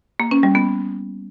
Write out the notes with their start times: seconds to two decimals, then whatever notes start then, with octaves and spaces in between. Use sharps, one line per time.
0.20 A#3
0.31 C#4
0.43 G3
0.55 B3